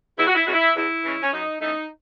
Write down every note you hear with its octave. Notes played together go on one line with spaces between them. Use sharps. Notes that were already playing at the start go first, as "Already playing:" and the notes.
E2 E4
F#4
E4
C#3 E3 G#3 C#4 F#4
E4
E2 E4
C#3 E3 G#3 C#4
C#4
F#2 D#4
E3 A3 C#4 D#4